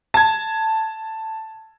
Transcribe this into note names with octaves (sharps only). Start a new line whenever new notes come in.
A5 G#6